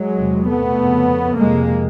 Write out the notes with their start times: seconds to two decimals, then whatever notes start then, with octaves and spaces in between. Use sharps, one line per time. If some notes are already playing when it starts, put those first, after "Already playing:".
Already playing: F#3 G#3
0.18 E2 C3
0.48 A3 B3
0.79 F2 C#3
1.38 F2 C3 G#3 A#3